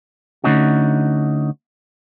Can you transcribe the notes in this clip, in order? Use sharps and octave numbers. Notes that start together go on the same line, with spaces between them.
D3 A3 C#4 D#4 F#4